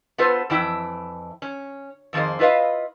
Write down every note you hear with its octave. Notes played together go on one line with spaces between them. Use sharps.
B3 F4 A4 B4 C5
F2 E3 E4 G5
C#4
F2 D#3 A#3 G#4 C5
E4 F4 B4 D#5 F5